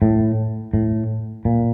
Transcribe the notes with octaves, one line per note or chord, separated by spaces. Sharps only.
A2
A2
A#2